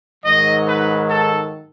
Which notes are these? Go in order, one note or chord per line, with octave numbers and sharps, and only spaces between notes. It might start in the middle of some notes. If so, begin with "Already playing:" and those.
G#2 D#3 F#3 D#5
B4
A4